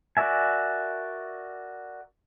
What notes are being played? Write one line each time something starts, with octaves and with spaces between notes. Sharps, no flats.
F#4 A#4 D5 E5 G#5